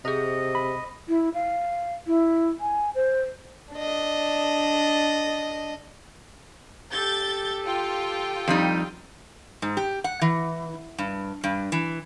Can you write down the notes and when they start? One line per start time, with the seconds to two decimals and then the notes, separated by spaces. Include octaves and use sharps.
0.05 C3 G#4 C5 D#5
0.55 B5
1.09 E4
1.34 F5
2.07 E4
2.60 G#5
2.95 C5
3.73 D4 D#5
6.91 G4 A4 G6 A6
7.65 F4 G5
8.48 F2 G3 D#4
9.62 G#2
9.77 G4
10.04 F#5
10.21 E3
10.98 G2
11.44 G2
11.72 E3